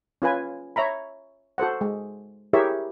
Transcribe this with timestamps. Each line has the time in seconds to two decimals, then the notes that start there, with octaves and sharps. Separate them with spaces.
0.22 C#4 F4 B4 G#5
0.76 C#5 E5 A#5 B5
1.58 F#4 A4 C5 F#5
1.81 G#3
2.53 E4 G4 G#4 A#4 C#5 E5